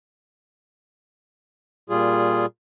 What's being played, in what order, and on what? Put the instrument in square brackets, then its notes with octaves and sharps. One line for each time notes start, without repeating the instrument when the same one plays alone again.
[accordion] A#2 G3 F4 G#4